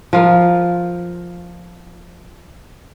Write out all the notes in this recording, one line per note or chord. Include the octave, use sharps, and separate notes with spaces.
F3 F4 A#4